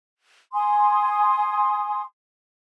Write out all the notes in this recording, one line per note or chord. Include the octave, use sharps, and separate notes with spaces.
G#5 C6 D#6